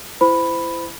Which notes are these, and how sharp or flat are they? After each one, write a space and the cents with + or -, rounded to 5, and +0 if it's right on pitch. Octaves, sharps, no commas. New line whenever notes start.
E4 +30 C5 -30 B5 +0